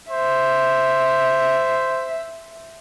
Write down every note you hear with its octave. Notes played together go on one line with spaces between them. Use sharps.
C5 E5